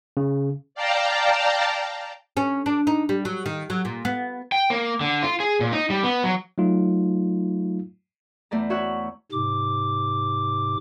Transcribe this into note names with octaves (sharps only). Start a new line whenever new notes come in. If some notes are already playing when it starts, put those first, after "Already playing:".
C#3
D5 F5 G5 A5 A#5
C#4
D4
D#4
G3
F#3
D#3
F#3
A#2
B3
G5
A#3
D3
F4
G#4
A#2
D#4
G3
B3
F#3
F#3 A3 D#4 F4
E2 A3 D5 A#5
F#4 C#5 E5 F#5
G#2 C3 D6